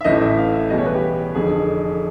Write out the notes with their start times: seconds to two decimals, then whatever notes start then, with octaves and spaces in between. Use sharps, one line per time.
0.01 E5
0.04 A1 A2 E3 D#5
0.21 E5
0.38 F5
0.53 E5
0.70 E2 B2 G3 D#5
0.78 C#5
0.86 B4
0.95 G4
1.34 F1 F2 D3 G#4